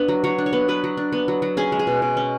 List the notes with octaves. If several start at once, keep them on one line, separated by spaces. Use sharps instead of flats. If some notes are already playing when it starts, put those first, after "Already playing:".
Already playing: B3 D4 B4
F#3
F#3 C#5
D4
C#5
B3
F#3 B4
F#3
D4
B3
F#3
F#3
C#4 G#4
G#3
G#4
B2
B2
C#4